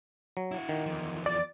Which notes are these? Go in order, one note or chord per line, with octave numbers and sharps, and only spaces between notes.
F#3
E4 F#4
D#3
E2 F3
D5